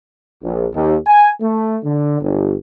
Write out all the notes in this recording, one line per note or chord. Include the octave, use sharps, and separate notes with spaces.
A#1
D#2
G#5
A3
D3
G1